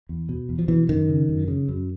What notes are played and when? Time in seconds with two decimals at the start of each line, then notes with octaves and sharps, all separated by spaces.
0.09 E2
0.29 B2
0.49 E2
0.59 F3
0.68 B2 E3
0.89 F#2 D#3
1.09 C#3
1.29 F#2
1.48 C#3
1.69 F#2